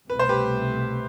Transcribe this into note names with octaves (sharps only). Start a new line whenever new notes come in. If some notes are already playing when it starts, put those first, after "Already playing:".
C2 B2 A3 B4
C5
G4 B4